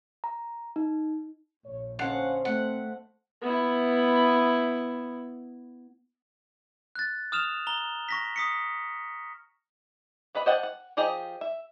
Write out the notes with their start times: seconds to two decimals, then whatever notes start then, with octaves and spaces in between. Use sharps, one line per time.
0.24 A#5
0.76 D#4
1.66 A#1 C#5
1.99 D3 C#4 D4 C5 D#5 F5 F#5
2.45 A3 C4 F#5
3.42 B3 E4
6.95 F#6 A6
7.32 D#6 F6 E7 F7
7.67 A#5 F7 G7
8.09 C#6 A#6 B6
8.36 D#6 B6 C#7
10.35 B3 B4 D#5 B5
10.46 C5 D#5 F#5 G5 A5
10.63 F#5
10.97 F3 G4 G#4 D#5 A#5
11.41 E5